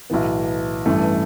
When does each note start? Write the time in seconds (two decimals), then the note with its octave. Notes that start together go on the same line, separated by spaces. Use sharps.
0.10 B1 A2 E3 B3
0.86 A1 G2 E3 A3